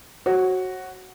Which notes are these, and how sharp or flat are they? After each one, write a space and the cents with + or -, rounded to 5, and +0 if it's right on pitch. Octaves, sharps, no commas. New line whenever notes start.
F#4 +5 C#5 -40